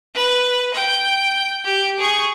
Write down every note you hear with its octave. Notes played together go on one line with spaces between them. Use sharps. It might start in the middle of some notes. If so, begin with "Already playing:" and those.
B4
G5
G4
G#4 C#6